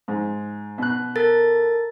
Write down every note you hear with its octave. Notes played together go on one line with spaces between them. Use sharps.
G#2
B2 F#6
A4 A#4 A6